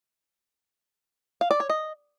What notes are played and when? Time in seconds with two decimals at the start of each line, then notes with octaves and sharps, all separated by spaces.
1.41 F5
1.51 D5
1.60 C#5
1.69 D#5